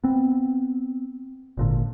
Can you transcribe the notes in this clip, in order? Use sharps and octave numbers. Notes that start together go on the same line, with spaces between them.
B3 C4
G#1 A#2 D3